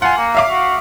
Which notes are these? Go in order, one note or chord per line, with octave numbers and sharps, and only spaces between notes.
F4 F#5 G#5
A#3
E5 F5 D6
F#4